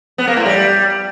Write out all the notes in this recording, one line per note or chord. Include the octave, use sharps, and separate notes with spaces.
B3
A#3
A2
G3